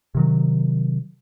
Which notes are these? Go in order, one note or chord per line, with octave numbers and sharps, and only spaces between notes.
C3 D#3 F#3